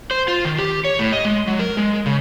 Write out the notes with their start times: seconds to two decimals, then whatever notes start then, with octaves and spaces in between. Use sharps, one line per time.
0.11 C5
0.28 F4
0.45 D#3
0.58 G4
0.85 C#5
0.99 A2
1.12 D#5
1.25 G#3
1.47 F#3
1.59 A#4
1.77 G#3
2.06 C#3